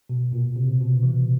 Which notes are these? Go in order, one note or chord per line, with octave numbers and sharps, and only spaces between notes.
B2
A#2
C3
B2
E3